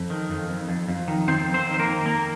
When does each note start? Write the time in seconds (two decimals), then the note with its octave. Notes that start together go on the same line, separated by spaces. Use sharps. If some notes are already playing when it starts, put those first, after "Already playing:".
Already playing: F2
0.10 D#3
0.30 F2
0.49 F2
0.69 F2
0.88 F2
1.08 D#3
1.28 D#3 C4 C5
1.47 F2
1.54 C4 C5
1.67 D#3
1.74 C5
1.80 A#3 A#4
1.86 D#3
2.06 F2 A#3 A#4